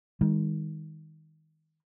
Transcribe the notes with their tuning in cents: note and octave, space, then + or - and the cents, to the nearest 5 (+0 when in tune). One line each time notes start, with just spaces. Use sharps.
D#3 +15 G#3 -35